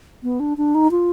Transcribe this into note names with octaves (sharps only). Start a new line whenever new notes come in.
B3
D4
D4
D#4
F4